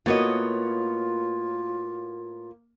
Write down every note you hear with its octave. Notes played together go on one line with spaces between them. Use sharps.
A2 A#3 B3 F4 F#4 A#4 C#5 D#5